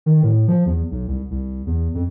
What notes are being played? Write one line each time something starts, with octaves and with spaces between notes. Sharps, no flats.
D#3
A2
F3
E2
B1
C2
C2
E2
F2